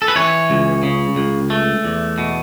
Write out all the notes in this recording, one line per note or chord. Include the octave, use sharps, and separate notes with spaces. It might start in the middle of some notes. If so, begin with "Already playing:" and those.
A4
B4
E3 C#5
C#2
C#3
C#2
A3
E2
B2